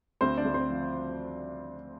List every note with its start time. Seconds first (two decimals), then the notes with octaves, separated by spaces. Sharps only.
0.21 D2 C4 C5
0.37 D4 D5
0.45 D2
0.54 C4 C5
0.70 F3